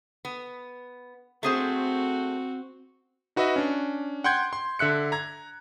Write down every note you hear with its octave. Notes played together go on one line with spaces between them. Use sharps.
B3
A3 C4 F#4 G#4 C5
D#4 F#4 B4 D#5 E5
C#4 D4
F#5 G5 C6 G6 G#6
C6
D3 E5 F#6 C#7
A#5 G#6